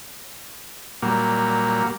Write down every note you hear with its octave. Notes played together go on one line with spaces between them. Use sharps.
A#2 F#3 G3 A#3